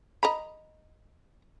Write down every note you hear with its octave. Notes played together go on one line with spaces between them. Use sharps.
D#5 A#5 B5